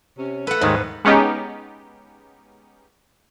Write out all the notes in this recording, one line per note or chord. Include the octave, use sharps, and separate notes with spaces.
C3 C#4
A3 A4 B4 F#5
D#2 G#2 D#3 G#3
G#3 B3 C#4 D#4 G4